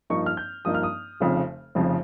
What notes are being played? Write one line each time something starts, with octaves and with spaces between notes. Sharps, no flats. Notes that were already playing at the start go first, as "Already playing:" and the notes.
G2 F3 A#3 D#4 C#6
F6
G6
G2 F3 A#3 D#4 D#6
F6
D#6
F1 F2 C#3 F3
F1 F2 C#3 F3